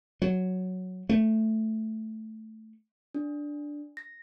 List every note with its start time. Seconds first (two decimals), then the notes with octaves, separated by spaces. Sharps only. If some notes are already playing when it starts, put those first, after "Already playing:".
0.22 F#3
1.09 A3
3.14 D4
3.97 A#6